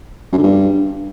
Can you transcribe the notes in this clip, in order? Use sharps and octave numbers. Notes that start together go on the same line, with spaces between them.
F#2
D3
G2